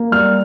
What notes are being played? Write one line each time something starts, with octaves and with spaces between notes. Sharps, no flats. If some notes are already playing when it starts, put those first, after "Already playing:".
Already playing: A#3
G3 F6